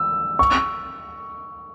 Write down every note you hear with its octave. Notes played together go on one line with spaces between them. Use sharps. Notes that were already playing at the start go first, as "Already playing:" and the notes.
Already playing: E6
C#6